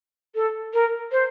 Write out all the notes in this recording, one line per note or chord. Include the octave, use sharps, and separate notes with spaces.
A4
A#4
C5